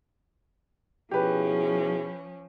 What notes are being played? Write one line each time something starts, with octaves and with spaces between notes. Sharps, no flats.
B2 F3 C#4 E4 G4 G#4 B4